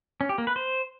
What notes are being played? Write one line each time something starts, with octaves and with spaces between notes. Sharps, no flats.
C#4
G4
A#3
B4
C5